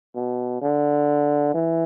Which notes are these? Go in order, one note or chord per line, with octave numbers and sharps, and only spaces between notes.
B2
D3
E3